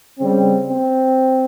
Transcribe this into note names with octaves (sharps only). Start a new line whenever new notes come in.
C#3 G3 C4
C4